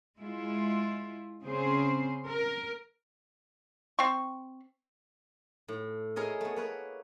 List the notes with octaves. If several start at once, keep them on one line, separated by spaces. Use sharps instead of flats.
G#3 E4 F4
C#3 C4 G#4 C5
A#4
C4 C#6
A2
E4 G#4 A#4 C#5 D#5
A3 B3
A#3 B4 C#5